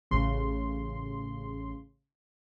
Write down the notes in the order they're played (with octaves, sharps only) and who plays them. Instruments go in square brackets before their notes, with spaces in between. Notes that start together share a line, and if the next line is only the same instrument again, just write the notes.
[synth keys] A1 C#3 C6